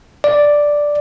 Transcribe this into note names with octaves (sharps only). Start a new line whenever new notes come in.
D5